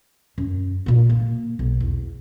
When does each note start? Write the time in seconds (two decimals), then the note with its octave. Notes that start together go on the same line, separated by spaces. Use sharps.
0.38 F#2
0.86 A#2 A#3
1.10 A#3
1.59 B1
1.80 E2